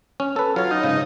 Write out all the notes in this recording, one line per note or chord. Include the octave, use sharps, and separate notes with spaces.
C#4
A4 B4
F#3 F4 C#5
D#4
G#2 C#3